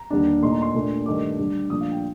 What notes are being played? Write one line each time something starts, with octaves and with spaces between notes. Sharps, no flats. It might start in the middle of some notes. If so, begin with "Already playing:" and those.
Already playing: A#5
D#2 D3 G3 D4
A#2 A3 D#4 C6
A#5
C6
A#2 A3 D4
G2 D#3 A3 D4 D6
G2 D3 G3
A#2 F3 A3 D4 D#6
F5
G5